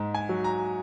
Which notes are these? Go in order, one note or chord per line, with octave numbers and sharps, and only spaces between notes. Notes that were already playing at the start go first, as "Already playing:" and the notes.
Already playing: G#2
G#5
F#3
A#5